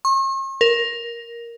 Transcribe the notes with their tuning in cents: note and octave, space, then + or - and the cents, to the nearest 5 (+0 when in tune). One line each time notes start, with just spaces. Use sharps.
C#6 -45
A#4 +10